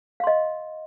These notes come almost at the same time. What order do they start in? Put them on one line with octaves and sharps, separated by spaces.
F5 C6 D#5